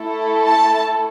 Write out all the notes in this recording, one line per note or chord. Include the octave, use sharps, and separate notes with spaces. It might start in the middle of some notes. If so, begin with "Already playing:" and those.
Already playing: A3 E4 A4
A5